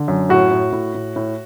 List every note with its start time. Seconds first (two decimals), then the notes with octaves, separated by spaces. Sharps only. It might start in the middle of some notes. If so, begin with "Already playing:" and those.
Already playing: D3
0.08 F#2
0.29 A2 F#4
0.51 A2
0.72 A2
0.94 A2
1.16 A2